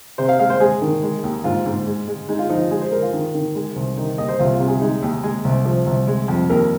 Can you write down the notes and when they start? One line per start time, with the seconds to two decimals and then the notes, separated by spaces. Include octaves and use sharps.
0.18 C3 C5
0.29 F5
0.39 G#3 F5
0.50 C5
0.60 G#3 G#4
0.82 D#3
1.03 G#3
1.23 D#2
1.44 G#2 F4
1.66 G#2
1.87 G#3
2.08 G#3
2.28 G#3 D#4
2.39 F4
2.50 F3 D#4
2.60 F4
2.71 G#3 G#4
2.81 C5
2.92 G#3 A#4
3.02 F4
3.13 D#3
3.34 D#3
3.55 G#3
3.76 C2
3.97 D#3 D#4
4.18 D#2 D#5
4.28 C5
4.39 C2 F4
4.54 F4
4.60 C3
4.67 G#4
4.81 G#3 D#4
5.02 D#2
5.23 G#3 G#4
5.44 C2
5.65 F3
5.86 C2
6.07 G#3
6.28 F2
6.49 D#2 A#4